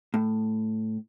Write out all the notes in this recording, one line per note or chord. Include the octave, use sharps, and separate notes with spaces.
A2